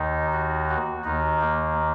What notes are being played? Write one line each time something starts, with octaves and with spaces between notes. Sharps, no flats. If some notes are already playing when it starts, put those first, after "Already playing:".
Already playing: D#2 D#3 D#4
F#4
F#4
D#2 D#3 D#4
A#3